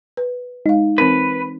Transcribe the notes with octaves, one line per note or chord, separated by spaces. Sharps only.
B4
G#3 D#4 F5
E3 C4 A#4 B4